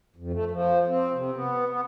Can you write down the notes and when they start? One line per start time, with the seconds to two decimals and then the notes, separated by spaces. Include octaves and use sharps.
0.16 F2
0.33 A3
0.51 F3
0.87 C4
1.13 C3
1.33 B3
1.69 B3